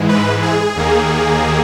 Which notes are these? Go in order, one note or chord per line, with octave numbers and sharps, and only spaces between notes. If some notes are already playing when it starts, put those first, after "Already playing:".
Already playing: G#2 E3 G#3
B4
G#4
D#2 D#3 A#3